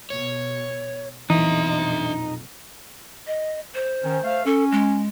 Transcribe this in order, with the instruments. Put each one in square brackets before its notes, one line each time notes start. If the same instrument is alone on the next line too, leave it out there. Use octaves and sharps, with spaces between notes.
[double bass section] B2 [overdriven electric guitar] C#5
[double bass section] B1 F2 A#2 [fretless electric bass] E3 [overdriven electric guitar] D4 E5 [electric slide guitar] D#4
[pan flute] D#5
C5
[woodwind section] D#3 C#4
A3 F5
[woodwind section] C#4 [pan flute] A4
[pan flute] G#3